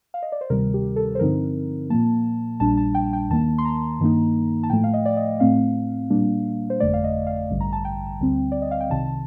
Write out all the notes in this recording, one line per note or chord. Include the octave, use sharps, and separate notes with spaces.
F5
D#5
D5
C5
D2 C3 D#3 G3 A#4
G4
A4
C5
G2 D3 F3 C4 D#4 A#4
A#2 F3 A#3 A5
A#1 A#2 G3 D4 A5
A5
G5
G5
D#2 D#3 A#3 A5
C6
A#5
G2 D#3 A#3 D#4
A5
A2 F3 A3 G5
F5
D#5
D5
D#5
A2 A3 C4 F5
A#2 G3 A#3 D4
C5
G1 F2 D3 A3 D5
F5
D#5
F5
A1 G2 D3 G3
A#5
A5
G5
D2 D3 G3 C4
D5
D#5
F5
G5
C2 C3 D#3 A5